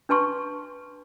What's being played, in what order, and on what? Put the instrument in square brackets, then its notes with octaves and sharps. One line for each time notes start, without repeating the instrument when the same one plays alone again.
[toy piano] D4 B4 A5 C6 C#6